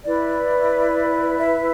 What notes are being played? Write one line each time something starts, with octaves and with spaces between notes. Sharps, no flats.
E4 B4 D5
E5